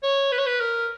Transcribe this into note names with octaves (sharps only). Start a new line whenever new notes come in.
C#5
B4
C#5
B4
A#4